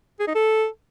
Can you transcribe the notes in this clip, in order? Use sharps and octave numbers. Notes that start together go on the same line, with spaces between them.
G#4
D#4
A4